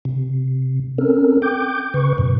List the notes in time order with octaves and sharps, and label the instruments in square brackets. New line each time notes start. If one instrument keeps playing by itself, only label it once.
[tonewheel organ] C3
C4 C#4 A4 A#4
G5 D6 G6
C#3 B4 C#6
F#2 B2